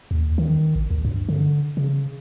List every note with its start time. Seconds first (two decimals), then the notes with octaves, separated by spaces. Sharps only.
0.11 D#2
0.38 D#3
0.75 A1
0.90 D2
1.05 G2
1.29 D3
1.77 C#3